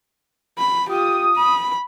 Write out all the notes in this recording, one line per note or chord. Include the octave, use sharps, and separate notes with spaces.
B5
F4 G4 D#6
B5